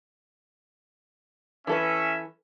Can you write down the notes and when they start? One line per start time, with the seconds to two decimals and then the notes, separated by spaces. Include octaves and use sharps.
1.67 E3 C#4 A4 B4 E5